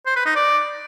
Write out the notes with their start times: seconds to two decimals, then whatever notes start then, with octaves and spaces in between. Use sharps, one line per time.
0.06 C5
0.16 B4
0.26 D#4
0.36 D5